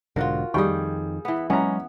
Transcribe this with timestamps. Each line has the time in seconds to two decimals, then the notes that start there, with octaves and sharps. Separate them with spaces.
0.16 B1 G#2 D3 F4 F#4 A#4
0.54 F2 D#3 G3 G#4 G5 C#6
1.25 E3 B3
1.50 F#3 G#3 B3 C#4 A#5